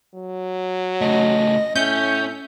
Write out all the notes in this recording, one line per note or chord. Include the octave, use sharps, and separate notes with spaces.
F#3
C#3 A3 D#5
A2 C#4 E5 G6